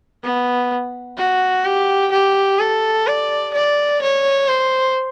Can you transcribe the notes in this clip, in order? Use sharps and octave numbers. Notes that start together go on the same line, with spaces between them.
B3
F#4
G4
G4
A4
D5
D5
C#5
C5